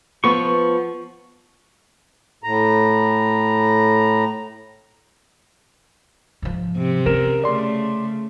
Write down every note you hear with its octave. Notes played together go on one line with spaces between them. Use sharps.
F3 B3 C#6
A2 A#5
G#2 F3
C3
C#4 A#4 E7
C#3 A3 D5 C6